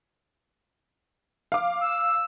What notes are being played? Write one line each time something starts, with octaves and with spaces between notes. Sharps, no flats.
F5 D6
E6